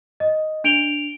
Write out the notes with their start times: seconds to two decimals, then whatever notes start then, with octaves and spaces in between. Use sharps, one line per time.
0.20 D#5
0.64 D4 D7 F7 G7